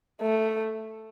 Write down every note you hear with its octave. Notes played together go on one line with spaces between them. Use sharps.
A3